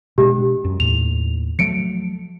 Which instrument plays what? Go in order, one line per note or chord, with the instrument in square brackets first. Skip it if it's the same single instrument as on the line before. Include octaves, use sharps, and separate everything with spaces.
[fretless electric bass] B2 G#3 D4 [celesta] G4
[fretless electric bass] F#2
[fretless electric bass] D#2 A2 [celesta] F7
[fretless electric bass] F3 F#3 A3 [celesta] C#7 D7